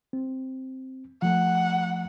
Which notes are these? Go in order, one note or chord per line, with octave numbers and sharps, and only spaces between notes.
C4
F3 A3 F#5